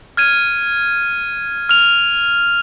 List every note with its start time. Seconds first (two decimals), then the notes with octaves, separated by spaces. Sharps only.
0.17 F6 G#6 D#7
1.69 F6 F7